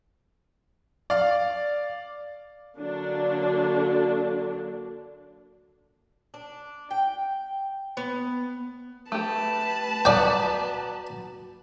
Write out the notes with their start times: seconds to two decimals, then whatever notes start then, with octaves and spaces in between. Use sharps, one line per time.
1.10 D5 F5
2.77 D3 F#3 A#3 D4
6.34 D4
6.91 G5
7.97 B3
9.12 A3 G4 B4 A5
10.05 F#3 B3 D5 F#5 G5